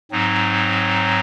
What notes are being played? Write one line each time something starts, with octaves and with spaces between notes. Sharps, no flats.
G#2 F#3 C4 D#4